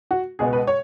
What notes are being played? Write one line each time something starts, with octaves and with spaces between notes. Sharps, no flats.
F#4
C#2 B2 G#3 B3 G#4
B4
C#5